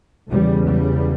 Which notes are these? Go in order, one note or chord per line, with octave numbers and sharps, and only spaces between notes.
E2 C#3 G3
G3